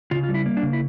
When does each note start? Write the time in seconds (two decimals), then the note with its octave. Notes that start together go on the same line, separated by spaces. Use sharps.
0.11 C#3 F4
0.23 F4
0.29 G3
0.34 E4
0.46 A#3
0.57 D4
0.63 C#3
0.73 E4